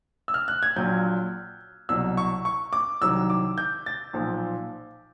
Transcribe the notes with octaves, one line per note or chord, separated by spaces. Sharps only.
E6
F6
F#6
G#6
A#1 A#2 F#3 G6
C2 B2 F#3 E6
C#6
C#6
D6
C2 C3 D#3 F#3 E6
D6
G6
A6
B1 A#2 F3